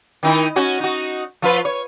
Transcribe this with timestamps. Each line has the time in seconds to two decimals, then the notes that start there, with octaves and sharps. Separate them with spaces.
0.23 D#3 D#4 E4
0.56 C#4 F#4
0.80 D#4 F#4
1.42 F3 F4 B4
1.65 C#5